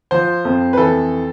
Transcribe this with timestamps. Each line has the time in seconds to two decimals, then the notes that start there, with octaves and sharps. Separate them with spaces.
0.11 F3 C5
0.45 F2
0.73 B4
0.77 E3 A4